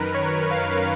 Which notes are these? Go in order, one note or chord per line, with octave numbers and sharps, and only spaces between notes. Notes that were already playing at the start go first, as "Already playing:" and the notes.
Already playing: F#2 D#3 A#4 B4
C#5
F5